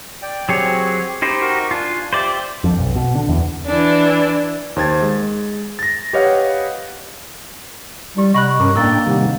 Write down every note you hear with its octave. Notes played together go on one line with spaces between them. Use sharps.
D5 G5
F#3 C4 G4 G#4 C#5
D#4 G4 C5 B5
F#4 A#4 C#6
D4 F4 G#5
G4 C5 D5 E5
F2
B1
B2
D3
E2
E3 D4
D#2 C5 G#6 A6
G#3
A6 A#6
G4 B4 C#5 D#5 F5 F#5
G3 E4 G4
C3 D#5 F#5 B5 C#6 F#6
G2 C#4 A#4 A#5 D6
A2 A#3 D4 G5 E6 A6
C3 D#3 G3 E4 F#5